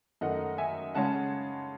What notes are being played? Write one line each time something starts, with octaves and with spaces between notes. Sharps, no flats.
F#2 D#3 A3 D#4 D#5 F#5
E5 G#5
C#3 G#3 C#4 F#5 A5